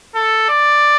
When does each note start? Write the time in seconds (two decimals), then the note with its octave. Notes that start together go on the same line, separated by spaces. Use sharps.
0.15 A4
0.49 D5